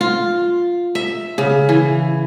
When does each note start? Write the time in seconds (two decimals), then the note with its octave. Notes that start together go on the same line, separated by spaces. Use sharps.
0.01 F4
0.95 E5
1.38 C#3
1.69 E3